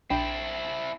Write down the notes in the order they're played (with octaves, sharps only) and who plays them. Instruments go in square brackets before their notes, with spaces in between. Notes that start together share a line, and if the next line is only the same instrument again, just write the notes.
[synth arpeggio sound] A#1 D4 B5 [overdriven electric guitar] C4 E4 [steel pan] G5